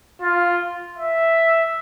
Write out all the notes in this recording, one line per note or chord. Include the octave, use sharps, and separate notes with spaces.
F4
E5